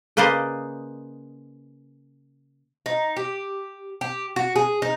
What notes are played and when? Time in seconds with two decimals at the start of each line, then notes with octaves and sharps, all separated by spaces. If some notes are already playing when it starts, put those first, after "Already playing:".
0.17 C#3 A#3 B4 C5 D5 D#5
2.86 D#4
3.17 G4
4.01 G4
4.36 F#4
4.56 G#4
4.82 D#4